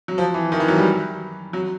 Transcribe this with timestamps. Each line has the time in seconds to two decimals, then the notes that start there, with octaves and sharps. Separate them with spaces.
0.08 F#3
0.18 F3
0.34 E3
0.52 D#3
0.60 E3
0.68 F#3
0.77 G3
1.53 F#3